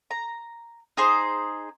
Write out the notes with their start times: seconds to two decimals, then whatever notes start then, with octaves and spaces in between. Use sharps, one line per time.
0.11 A#5
0.97 D#4 G#4 C5